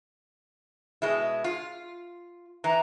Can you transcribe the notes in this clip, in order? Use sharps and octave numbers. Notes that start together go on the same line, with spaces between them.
B2 G#3 E4
F4
E3 A#5